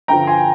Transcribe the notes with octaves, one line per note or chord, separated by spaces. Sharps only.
G2 D3 F3 G5 A#5
G#5 C6